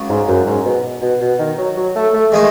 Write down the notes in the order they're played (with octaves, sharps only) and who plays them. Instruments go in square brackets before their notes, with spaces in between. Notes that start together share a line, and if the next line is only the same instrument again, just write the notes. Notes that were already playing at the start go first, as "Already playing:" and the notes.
Already playing: [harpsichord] C#2 C#3 F#3
[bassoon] G#2
F#2
G#2
B2
B2
B2
D#3
F#3
F#3
A3
A3
[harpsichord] D#3 A3 D#4 [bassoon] G#3